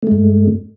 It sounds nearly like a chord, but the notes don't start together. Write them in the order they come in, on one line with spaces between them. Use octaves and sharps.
A3 G#3 G2